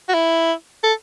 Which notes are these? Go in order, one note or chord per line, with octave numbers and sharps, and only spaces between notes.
F#4
E4
A4